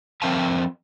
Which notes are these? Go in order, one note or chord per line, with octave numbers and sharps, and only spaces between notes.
F3 C4 A#4 E5 F5 A5